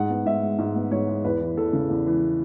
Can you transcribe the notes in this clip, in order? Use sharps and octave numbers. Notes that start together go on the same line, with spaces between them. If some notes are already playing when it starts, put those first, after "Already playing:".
Already playing: G#2 F#5
B3
G#2 E5
G#3
G#2
B3
G#2 C#5
G#3
E2 B4
E3
E2 A4
C#3
E2
E3